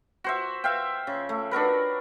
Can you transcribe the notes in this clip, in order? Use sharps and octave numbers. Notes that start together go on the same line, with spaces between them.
F#4 C5 E5
E5 F5 G5
C#3
A3
D4 F#4 A#4 B4